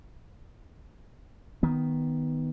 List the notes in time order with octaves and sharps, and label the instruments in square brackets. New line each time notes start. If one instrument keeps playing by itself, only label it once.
[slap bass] D#3 B3